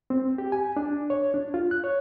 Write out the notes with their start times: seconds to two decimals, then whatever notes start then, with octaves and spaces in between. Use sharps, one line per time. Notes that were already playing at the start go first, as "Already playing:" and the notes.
0.10 C4
0.38 G4
0.52 G#5
0.77 D4
1.10 C#5
1.34 D4
1.54 F4
1.71 F#6
1.84 C#5